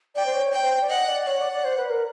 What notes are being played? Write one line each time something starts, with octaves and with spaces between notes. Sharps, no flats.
D5 G5
C5
C#5
G5
C5
D5
D#5 F#5
D5
C#5 F#5
D5
D5
C5
B4
A#4